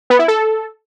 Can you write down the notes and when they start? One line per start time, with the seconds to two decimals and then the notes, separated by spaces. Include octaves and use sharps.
0.10 B3
0.19 E4
0.28 A4